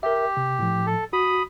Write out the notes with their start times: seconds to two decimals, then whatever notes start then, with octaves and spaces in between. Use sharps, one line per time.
0.03 G4 A#4 E5
0.37 C3
0.59 A2 F3
0.87 A4
1.13 F#4 B5 D#6